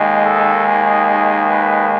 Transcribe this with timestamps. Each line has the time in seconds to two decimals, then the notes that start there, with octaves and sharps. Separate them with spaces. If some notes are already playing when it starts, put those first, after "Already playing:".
Already playing: D#2 D#3 G#3
0.24 A4
0.66 G#4
1.08 G#4
1.49 B4